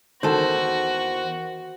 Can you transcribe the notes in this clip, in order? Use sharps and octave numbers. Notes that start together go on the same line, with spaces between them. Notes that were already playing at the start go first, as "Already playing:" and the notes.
E2 D#3 F#4 A4 C5